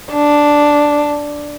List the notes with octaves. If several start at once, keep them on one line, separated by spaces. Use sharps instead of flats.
D4